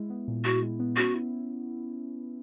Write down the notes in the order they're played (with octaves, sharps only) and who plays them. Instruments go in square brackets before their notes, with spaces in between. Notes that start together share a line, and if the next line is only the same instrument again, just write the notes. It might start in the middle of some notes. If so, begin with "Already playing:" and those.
Already playing: [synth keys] G#3 E4
B3
A#2
[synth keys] E4 [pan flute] F#4
[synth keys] G#3
B3
[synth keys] C#4 [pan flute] F#4
[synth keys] E4